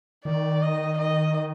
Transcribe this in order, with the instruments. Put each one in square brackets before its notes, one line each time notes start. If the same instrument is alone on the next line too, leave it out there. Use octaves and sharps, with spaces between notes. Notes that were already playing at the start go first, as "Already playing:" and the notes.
[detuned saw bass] D#3 [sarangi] D5
[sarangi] D#5
D#5